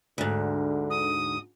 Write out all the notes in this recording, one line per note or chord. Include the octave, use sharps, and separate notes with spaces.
D2 G#2 D3
D#6